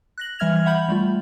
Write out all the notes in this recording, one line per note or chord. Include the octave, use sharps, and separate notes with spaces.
F#6 A#6 F#7
E3 G3 E5 F6 G#6 F7
E5 F#5 B5 G6 F#7
G3 A3 F4